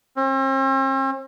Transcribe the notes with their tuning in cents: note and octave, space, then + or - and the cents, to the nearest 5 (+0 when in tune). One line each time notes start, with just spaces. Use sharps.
C4 +45